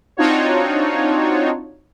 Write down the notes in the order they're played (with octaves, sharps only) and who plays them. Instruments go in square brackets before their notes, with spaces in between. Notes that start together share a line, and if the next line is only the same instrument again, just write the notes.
[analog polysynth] C4 D4 D#4 F4 F#4 C#5